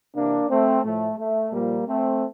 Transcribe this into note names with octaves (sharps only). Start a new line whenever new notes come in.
C3 E3 A#3 D4
A3 C4
A2 F3 A3
A3
A#2 F3 G3 A#3
A3 C4